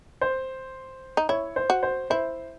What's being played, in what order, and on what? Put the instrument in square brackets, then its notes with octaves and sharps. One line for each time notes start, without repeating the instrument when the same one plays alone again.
[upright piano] C5
[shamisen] D#4
[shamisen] E4 [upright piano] C#5
[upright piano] C5
[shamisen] F#4
[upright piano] C5
[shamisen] E4 [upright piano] C5